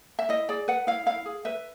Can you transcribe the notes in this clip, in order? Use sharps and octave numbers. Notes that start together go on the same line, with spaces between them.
E5
E4 D#5
G#4 D5
B4 F#5
E4 F5
E4 F5
G#4
B4 E5